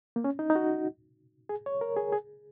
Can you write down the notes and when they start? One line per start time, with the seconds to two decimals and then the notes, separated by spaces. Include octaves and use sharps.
0.16 A#3
0.24 C#4
0.39 D#4
0.50 D#4
0.56 F#4
1.49 G#4
1.66 C#5
1.81 A#4
1.97 G#4
2.12 G#4